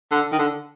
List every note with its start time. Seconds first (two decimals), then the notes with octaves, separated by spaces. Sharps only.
0.11 D3
0.32 D#3
0.39 D3